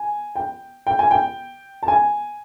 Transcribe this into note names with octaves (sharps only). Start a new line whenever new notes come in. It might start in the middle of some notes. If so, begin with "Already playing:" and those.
Already playing: G#5
G5
G5
G#5
G5
A5
G#5